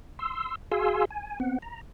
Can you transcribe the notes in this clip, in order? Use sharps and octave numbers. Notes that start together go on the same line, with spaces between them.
C6 E6
F#4 G#4 F5 G#5 C6 E6
G#5
B3 C4 F#5
A#5